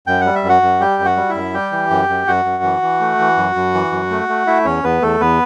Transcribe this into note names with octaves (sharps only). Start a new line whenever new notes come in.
F#2 G5
G3 F#5
E5
F#2
F#4 F#5
F#2
G3 G4 G5
F#2
F#4 F#5
G3
E4 E5
F#2
G3 G4 G5
E3
F#2
F#2
F#2 F#4 F#5
F#2
E3
E3
A3
E3
F#2
F#2
E3
F#2
A3
A3
A3 E4 E5
E2 C#4 C#5
E2 B3 B4
E2 A3 A4
E2 B3 B4